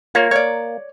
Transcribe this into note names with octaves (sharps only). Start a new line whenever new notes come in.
A#3 F4 C#5
C#5 D5